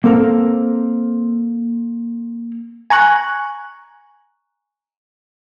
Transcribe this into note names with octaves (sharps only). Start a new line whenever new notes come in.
A#3 C4 A4 A#4
G#5 A#5 C#6 F#6